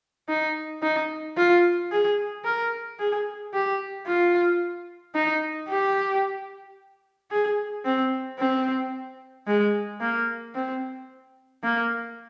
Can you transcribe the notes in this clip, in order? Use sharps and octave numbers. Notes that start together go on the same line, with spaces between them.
D#4
D#4
F4
G#4
A#4
G#4
G4
F4
D#4
G4
G#4
C4
C4
G#3
A#3
C4
A#3